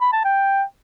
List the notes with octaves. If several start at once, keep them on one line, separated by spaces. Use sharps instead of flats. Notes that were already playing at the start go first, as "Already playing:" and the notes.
B5
A5
G5